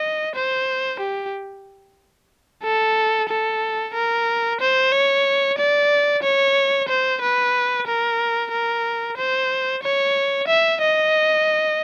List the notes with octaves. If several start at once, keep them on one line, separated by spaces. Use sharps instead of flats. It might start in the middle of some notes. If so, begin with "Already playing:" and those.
Already playing: D#5
C5
G4
A4
A4
A#4
C5
C#5
D5
C#5
C5
B4
A#4
A#4
C5
C#5
E5
D#5